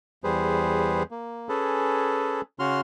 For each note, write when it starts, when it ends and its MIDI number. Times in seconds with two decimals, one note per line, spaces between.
0.24 1.03 40
0.24 1.03 55
0.24 1.03 68
0.24 1.03 71
0.24 1.03 72
1.11 1.48 58
1.49 2.41 61
1.49 2.41 68
1.49 2.41 69
1.49 2.41 71
2.59 2.81 49
2.59 2.81 61
2.59 2.81 66
2.59 2.81 84
2.59 2.81 89